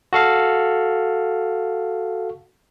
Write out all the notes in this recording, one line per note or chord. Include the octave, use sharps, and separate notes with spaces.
F#4 A4 F5